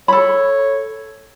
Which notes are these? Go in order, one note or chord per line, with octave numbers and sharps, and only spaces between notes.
A4 C#5 B5